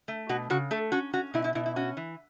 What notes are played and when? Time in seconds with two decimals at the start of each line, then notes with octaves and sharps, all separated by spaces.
0.08 A3
0.29 B2 F#4
0.50 C#3 F#4
0.71 A3 A4
0.92 C#4 F#4
1.13 C#4 F#4
1.34 B2 E4
1.44 E4
1.55 B2 E4
1.66 E4
1.76 C#4 F#4
1.97 E3